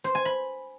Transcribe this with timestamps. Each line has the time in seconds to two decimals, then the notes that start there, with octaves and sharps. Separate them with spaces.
0.04 C5
0.15 G#5
0.25 B5